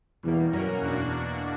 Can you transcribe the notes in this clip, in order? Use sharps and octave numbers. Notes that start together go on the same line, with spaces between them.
E2 B2 G3 A#3
F#2 B2 A#3 C#4 F#4 A#4
E2 B2 A#3 D4 F#4